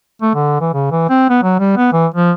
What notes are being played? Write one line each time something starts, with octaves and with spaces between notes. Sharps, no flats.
A3
D3
E3
C#3
E3
C4
B3
F#3
G3
B3
E3
F3